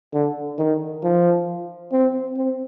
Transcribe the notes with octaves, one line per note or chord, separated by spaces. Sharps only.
D3
D#3
F3
C4
C4